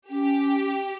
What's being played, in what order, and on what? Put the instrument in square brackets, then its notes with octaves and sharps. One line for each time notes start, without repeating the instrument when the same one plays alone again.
[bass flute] C#4 [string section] G4